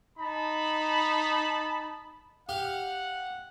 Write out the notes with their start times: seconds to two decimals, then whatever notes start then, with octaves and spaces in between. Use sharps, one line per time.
0.18 D#4 A5 B5
2.49 G4 F5 F#5